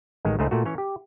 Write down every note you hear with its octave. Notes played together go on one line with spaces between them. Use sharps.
A1 D#3 G#3
C#2 A3 D#4 G#4 C5
A#2 A3 F#4
E3 C#4 C#5
G4